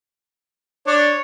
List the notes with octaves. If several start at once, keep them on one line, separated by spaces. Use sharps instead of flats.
D4 C#5